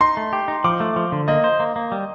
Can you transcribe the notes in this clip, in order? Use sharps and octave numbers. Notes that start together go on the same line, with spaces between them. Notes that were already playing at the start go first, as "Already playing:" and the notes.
D#4 C6
A3
G4
D#4
F3 D6
A3
F3
D3
A#3 D#5
C5
A#3
A#3
G3